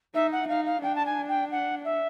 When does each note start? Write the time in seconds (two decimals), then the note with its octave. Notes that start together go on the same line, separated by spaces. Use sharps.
0.14 D#4 E5
0.32 F#5
0.48 D#4 F5
0.66 F5
0.82 D4 G5
0.95 A5
1.05 G#5
1.28 G5
1.51 F#5
1.84 E5